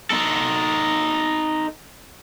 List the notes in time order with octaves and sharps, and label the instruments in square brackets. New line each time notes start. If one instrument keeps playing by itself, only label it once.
[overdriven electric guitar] D#4 A4